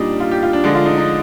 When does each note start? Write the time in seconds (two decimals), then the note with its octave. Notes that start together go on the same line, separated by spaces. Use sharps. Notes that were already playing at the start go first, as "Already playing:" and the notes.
Already playing: A#2 G3 D4 D#4
0.20 F4
0.31 G4
0.43 F4
0.53 D4
0.64 D3 F3 G#3 D4
0.75 F4
0.86 D#4
0.98 D#4